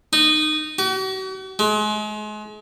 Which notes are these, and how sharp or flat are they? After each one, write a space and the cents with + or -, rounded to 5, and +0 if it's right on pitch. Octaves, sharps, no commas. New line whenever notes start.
D#4 -15
F#4 +45
G#3 +35